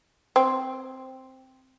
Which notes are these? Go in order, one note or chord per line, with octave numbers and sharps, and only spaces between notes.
C4